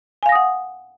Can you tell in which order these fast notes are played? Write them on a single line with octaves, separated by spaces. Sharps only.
G#5 F5 A#6 D#6 F#5